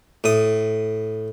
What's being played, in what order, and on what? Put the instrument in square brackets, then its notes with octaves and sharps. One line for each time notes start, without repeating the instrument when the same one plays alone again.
[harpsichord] A2 D#6